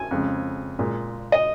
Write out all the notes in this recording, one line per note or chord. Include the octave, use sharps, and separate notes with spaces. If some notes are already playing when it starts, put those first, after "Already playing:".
Already playing: G#5
F2 C#3 G#3
A#2 G#3
D#5